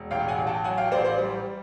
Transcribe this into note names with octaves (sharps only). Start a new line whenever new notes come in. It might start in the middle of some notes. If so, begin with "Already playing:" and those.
Already playing: E1
A1 F5 G5
F#5 G#5
A1
G5 A5
F#3 F#5 G#5
F5 G5
A1 C5 D5
C5 D5
G3